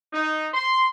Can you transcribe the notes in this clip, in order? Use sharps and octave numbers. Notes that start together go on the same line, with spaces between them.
D#4
C6